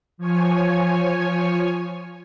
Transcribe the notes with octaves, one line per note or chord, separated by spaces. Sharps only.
F3 C#5 G#5